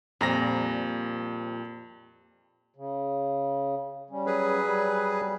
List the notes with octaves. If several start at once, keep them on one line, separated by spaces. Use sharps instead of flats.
F2 A#2 F3 G3 A#5 A#6
C#3
G3 C#4
F#3 G#4 B4
G3